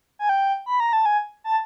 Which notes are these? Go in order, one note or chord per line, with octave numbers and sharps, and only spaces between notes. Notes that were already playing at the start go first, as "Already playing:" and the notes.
G#5
G5
B5
A#5
A5
G#5
A5